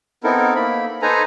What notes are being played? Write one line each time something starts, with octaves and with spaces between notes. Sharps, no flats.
B3 C4 D#4 E4 A4 A#4
A#3 B5
D#4 A4 B4 C5 G#5 A#5